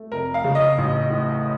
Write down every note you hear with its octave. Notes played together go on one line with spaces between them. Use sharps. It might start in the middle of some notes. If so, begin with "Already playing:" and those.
Already playing: A3
F1 A#4
F5
C#3
D#5
A1
A2